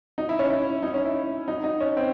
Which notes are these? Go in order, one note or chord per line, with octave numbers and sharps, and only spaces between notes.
D#4
E4
C#4
E4
D#4
C#4
E4
D#4
D#4
C#4
C4